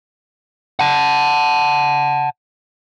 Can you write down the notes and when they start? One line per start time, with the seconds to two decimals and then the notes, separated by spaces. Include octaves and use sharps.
0.79 F#5 A5